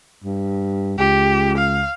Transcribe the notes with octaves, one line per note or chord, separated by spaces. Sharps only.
G2
C#2 G4
F5